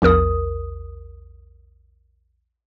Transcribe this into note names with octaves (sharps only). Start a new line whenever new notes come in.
A#1 E2 A#4 D#6